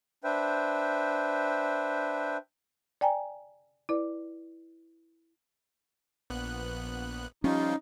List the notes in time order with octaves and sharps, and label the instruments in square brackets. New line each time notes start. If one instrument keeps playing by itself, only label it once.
[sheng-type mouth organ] D4 B4 C5 E5 G5
[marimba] D5 G5 G#5 A#5
E4 B4 D5
[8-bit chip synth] A#1 B3 F#6
[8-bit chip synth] F3 G3 F4 [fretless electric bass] C#4 [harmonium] D#4